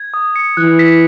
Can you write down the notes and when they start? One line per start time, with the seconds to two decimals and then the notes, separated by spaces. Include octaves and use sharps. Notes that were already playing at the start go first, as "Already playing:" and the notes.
Already playing: G#6
0.14 D#6
0.36 C#7
0.57 E3 F#6
0.79 B6